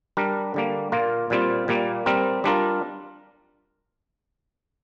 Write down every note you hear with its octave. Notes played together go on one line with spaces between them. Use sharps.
G3 D4 A#4
D3 G3 A#3
A#2 A#3 F4 A#4
A#2 G3 C4 F4
A#2 G3 A#3
G3 C4 A#4
G3 D4 F4 A#4